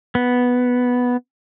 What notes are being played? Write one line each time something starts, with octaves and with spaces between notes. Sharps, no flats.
B3